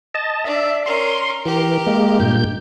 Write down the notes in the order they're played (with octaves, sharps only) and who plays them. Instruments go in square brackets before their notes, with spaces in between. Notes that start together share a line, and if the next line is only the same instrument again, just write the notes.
[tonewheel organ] D#5 A5
[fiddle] D4 [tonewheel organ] E5
[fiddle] C#4 A#4 [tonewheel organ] C6
[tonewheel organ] E3 [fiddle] G4 A#4
[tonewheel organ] G#3 A#3
G2 A#2 G6